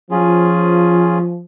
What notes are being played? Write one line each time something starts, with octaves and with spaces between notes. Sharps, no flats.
F3 C#4 F4 G#4